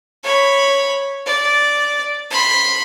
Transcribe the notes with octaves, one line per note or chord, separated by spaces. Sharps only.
C#5 B5
D5
B5 C6